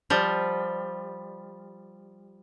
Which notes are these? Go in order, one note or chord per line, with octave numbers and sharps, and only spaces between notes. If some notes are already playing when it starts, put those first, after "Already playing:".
F3 G3